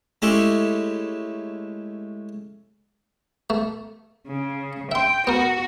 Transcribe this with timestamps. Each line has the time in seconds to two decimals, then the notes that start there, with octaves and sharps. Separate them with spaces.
0.22 G#3 A3 C#4 E4 G4 A4
3.50 A3
4.27 C#3
4.92 E5 G5 C6
5.27 B3 F#4 A#4